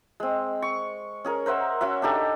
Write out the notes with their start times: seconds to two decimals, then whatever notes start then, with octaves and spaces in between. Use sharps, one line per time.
0.20 G#3 C4
0.62 C#6
1.25 C#4 G#4 A#4
1.46 A#4 C5 E5 F#5
1.81 C#4 F#4 E5
2.02 D4 D#4 G4 A4